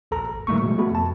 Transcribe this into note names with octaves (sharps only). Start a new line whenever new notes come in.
A#1 D#2 A4 A#5
G#1
A2 D#3 G3 A3 A#3 C#6
B2 F3 F#3 G#3 A3
A3 B3 F#4 A4 B5
F2 A5